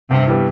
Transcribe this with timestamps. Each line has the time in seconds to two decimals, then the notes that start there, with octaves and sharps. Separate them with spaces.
0.11 G2 C3
0.27 E3 G3 B3